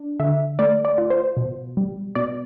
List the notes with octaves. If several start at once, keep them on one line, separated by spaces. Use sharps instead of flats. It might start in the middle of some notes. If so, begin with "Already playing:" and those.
Already playing: D4
D3 E5
A3 D5
D5
F4
C5
B2
G3
B2 D5